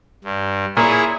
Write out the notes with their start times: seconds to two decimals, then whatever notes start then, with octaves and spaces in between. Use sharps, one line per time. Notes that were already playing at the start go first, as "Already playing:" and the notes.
0.24 G2
0.77 A#2 E4 G#4 C#5